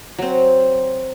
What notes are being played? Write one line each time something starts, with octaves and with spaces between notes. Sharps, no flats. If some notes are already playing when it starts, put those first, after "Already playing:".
F#3 C4